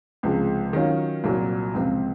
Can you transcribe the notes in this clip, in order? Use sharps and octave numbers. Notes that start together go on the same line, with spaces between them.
C#2 C3 F3 G#3
D#3 F#3 C#4 F4
C2 A#2 F#3 C4
C#2 C3 F3 C4 F4